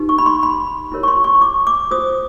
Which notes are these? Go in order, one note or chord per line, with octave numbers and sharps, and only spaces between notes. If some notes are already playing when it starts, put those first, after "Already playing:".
Already playing: D#4 G4 B4
C#6
B5
C6
B5
E4 G4 A#4 C#5
C#6
C6
C#6
D6
D6
F4 G#4 C5 D#6